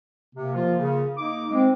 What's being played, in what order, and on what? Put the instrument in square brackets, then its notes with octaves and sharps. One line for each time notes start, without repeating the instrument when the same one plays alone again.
[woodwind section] C3 [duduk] A#3
[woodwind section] F3 F4
C#3
[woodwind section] A#3 D6 [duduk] D#4
[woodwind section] G#3 [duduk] C4